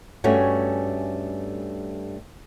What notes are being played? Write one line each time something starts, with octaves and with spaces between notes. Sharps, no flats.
G2 A3 C#4 F#4 C#5 G#5